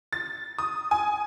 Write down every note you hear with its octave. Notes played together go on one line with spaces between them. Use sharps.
A6
D#6
G#5